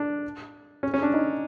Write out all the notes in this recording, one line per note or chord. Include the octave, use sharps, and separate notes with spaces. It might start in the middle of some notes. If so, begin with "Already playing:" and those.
Already playing: D4
C#4
C#4
D4
D#4